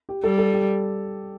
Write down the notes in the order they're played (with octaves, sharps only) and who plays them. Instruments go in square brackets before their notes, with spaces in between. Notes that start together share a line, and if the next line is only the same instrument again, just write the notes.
[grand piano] G4
[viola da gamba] G3 [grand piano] A4
[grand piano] A4
G4